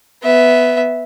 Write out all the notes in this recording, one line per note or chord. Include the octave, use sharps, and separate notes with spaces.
B3 E5